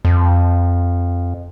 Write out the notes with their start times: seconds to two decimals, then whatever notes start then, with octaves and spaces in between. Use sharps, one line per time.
0.05 F2